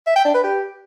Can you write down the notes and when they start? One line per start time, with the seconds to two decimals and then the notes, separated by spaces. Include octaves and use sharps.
0.07 E5
0.16 G5
0.25 D4
0.34 B4
0.44 G4